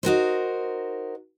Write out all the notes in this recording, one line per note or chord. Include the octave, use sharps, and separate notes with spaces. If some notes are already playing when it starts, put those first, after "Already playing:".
D#4 F#4 A#4 C5